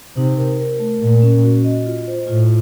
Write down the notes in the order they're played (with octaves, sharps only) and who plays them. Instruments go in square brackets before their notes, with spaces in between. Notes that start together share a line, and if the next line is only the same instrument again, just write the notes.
[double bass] C3 [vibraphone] D#4
[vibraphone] A#4
A#4
A3
[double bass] A#2 [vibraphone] A#4
[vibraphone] C#4
F#4
D#5
F4
C5
[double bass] A2 [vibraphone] F4